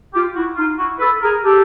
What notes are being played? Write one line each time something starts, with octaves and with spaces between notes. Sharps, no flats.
F4 G4
E4 F#4
D#4 F4
E4 F#4
A4 B4
G#4 A#4
G4 A4